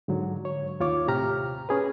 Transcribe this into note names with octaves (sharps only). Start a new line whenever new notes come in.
G#2 D3 F#3
C#5
D#2 F4 C#5 D6
A2 C3 G4 A#5 F6
C#4 G#4 B4